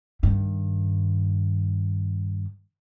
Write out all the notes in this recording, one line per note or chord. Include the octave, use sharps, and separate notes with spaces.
G2 D#3